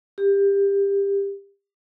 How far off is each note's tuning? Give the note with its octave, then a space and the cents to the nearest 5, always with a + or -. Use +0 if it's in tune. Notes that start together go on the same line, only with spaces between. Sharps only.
G4 +20